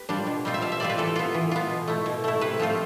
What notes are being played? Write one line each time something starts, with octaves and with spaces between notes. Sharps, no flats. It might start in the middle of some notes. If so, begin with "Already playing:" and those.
Already playing: G4 B4
G3 D4 F4
B2
G3 C4 F4
E5
B2 F5
E5
G3 C4 F4 D5
B4
E3 A4
B3 F4
E3
B3 F4
B2
A3 E4
B2
A3 E4
C3 B4
F3 A3 C4 F4